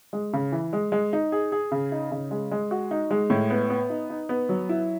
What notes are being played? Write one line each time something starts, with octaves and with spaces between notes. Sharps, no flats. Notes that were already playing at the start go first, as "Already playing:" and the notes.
G#3
C#3
E3
G#3
G#3
D#4
G#4
G#4
C#3
D#4
C#3
G#3
G#3
F#4
D#4
G#3
A2
B3
B3
D#4
D#4
B3
F#3
E4